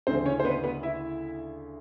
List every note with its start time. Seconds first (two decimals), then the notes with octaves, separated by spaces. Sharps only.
0.07 D2 C#3 E3 C4 C5
0.25 C#4 C#5
0.40 C5
0.45 B3 B4
0.64 B3 B4
0.83 E4 E5